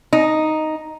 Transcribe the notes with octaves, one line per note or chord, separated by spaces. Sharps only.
D#4